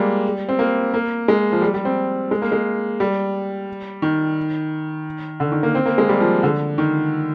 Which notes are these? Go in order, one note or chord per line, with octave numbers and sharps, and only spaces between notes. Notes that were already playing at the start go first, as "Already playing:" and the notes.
Already playing: G3 G#3 A#3
C4
A#3
A#3
G#3
F3
G3
G3
C4
G#3
A#3
G#3
G3
D#3
D3
D#3
A#3
C4
A#3
G#3
G3
F3
D3
D#3